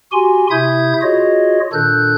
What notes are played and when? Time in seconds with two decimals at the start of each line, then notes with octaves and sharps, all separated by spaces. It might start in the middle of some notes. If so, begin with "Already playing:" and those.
0.12 F#4 G4 G#5 C6
0.50 C3 E4 E5 D#6 G6 G#6
1.02 F4 F#4 G#4 C#5 D#5
1.73 A#2 D#3 D4 A4 F#6 G6